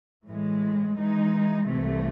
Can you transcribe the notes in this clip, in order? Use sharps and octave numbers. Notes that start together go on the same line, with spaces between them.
A2 E3 G#3
E3 G#3 D#4
C2 C3 E3 A3